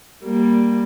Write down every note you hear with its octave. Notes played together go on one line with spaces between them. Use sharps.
G3 A#3